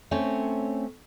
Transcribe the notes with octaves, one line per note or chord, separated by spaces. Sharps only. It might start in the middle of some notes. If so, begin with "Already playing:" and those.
A3 C4 C#4 C#5